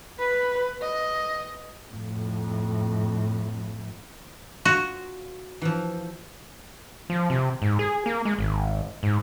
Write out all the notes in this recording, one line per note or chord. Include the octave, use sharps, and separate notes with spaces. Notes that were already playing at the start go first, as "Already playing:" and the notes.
B4
D#5
F2 A2
F4 F#4
E3 F3
F3
C3
G#2
G#4
A#3
G#3
G#1
G#2